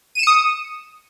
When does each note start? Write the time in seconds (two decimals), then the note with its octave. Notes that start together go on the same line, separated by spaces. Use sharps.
0.15 D#7
0.19 E7
0.23 C#7
0.27 D#6